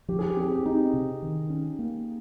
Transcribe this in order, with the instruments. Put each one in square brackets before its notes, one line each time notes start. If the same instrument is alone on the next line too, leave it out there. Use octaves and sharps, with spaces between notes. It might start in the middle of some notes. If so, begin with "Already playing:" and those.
[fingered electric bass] F3 [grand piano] G4
[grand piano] G#4
G4
[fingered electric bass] C4 [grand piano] G#4
[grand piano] G4
[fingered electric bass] C4 [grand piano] D#4
[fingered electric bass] C3
D#3
C#4
A#3